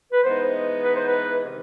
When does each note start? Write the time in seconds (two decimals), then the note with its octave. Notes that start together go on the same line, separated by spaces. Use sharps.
0.12 B4
0.23 E3 G#3 B3 D#4 C5
0.84 B4
0.96 C5
1.08 B4
1.45 C3 D#3